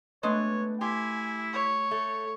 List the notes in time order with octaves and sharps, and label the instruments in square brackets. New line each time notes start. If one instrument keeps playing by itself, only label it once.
[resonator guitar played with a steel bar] G#3 D4 B4 [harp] A3 B3 [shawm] C#5
[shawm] E4 [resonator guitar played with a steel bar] G4 [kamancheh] G#5 [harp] C6 D6
[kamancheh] C#5
[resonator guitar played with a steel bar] A3